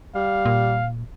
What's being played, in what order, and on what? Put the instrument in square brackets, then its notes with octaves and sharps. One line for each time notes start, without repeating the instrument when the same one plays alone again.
[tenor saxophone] G3 [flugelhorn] F5
[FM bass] A#2